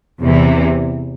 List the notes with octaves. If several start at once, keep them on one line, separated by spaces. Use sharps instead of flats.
E2 C3 E3